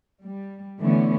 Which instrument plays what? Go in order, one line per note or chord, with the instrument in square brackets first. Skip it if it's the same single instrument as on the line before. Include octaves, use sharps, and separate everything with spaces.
[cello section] G3
D3 E3 A3 B3 C#4